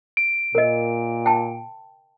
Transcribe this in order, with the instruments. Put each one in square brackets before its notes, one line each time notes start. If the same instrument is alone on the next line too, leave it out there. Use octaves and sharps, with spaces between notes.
[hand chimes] D7
[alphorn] A#2 [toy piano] A#4 D#5
[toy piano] G5 A5